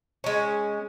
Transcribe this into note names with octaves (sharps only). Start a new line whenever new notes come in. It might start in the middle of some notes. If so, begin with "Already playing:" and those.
G#3 C#4